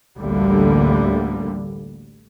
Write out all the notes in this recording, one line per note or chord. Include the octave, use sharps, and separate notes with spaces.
A1 D2 D3 G3 A#3